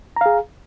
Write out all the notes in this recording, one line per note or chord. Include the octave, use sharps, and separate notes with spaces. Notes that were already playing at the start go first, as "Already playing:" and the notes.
G#4 F5 A#5